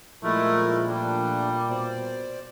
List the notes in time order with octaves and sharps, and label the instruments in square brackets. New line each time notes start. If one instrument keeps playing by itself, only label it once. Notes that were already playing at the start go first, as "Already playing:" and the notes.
[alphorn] A#2 [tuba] F3 [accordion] G#3 E4 A#4 [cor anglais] A3
[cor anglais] G3 [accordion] A3 D4
[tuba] B2 [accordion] C5 D5